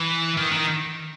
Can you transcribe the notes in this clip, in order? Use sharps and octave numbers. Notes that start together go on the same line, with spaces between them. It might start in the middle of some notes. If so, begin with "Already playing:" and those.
Already playing: E3
D#3
D#3